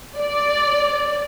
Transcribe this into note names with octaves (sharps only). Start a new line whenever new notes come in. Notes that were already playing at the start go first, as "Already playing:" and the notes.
D5